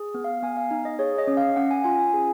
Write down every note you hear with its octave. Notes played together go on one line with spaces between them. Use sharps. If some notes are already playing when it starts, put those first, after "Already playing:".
Already playing: G#4
B3
F5
B3 G#5
F5
D#4
D#5
G#4 C#5
D#5
C#4
F5
C#4 F#5
G#5
F4 G#5
G#5
G#4